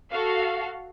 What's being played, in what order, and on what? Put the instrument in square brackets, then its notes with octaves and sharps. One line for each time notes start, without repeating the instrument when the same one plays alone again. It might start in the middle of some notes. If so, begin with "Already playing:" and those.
[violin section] F#4 A4 F5